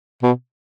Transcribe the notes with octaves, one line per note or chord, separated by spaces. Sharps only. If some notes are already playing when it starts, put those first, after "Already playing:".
B2